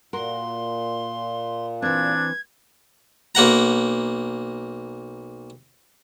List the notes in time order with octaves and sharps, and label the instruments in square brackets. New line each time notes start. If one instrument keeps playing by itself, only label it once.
[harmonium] A#2 [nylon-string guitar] F#4 A#4 [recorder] C6
[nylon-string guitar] E3 C4 [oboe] D4 [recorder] G#6
[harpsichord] B1 A#3 F#5 A#5